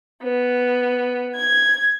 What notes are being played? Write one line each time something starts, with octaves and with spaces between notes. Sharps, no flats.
B3
G#6